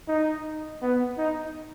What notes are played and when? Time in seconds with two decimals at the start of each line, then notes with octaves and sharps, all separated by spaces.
0.08 D#4
0.82 B3
1.18 D#4